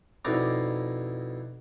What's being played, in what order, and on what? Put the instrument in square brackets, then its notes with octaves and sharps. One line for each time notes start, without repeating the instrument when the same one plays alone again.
[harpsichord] F2 B2 D#4 E4 D5 A#5